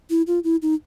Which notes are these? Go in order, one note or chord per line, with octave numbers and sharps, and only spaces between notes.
E4
F4
E4
D#4